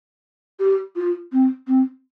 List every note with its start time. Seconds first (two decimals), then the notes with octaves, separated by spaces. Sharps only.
0.60 G4
0.96 F4
1.32 C4
1.68 C4